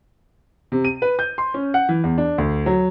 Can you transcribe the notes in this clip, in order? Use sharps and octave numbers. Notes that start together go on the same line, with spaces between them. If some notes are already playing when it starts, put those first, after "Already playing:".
C3
D#7
B4
G6
C6
C#4
F#5
E3
E2
D4
D2
F#3